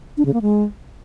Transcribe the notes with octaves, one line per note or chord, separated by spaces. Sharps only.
D4
C#3
A#3
G#3